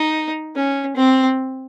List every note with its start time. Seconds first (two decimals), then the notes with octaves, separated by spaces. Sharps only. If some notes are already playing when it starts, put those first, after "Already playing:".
Already playing: D#4
0.55 C#4
0.96 C4